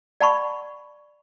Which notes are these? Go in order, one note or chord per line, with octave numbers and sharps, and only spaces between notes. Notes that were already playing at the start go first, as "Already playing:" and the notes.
D5 F#5 A5 B5 C#6